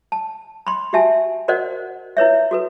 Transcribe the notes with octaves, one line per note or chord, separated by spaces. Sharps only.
A5
B5 C6
F#4 G4 E5 G#5 A5
F#4 A#4 C5 D5 D#5 F#5
E4 B4 C#5 E5
F#4 A4 B4